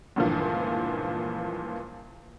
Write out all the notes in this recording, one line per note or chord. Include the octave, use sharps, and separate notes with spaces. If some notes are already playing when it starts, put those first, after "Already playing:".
C#2 G2 A#2 D3 E3 F3